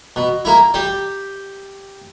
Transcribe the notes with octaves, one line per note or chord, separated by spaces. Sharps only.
B2
A#3 E4
G3 G4